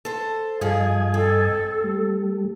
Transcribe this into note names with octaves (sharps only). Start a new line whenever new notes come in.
A4 C5
G2 F3 G#4 D#5 G#5
C4 A4
G3 A3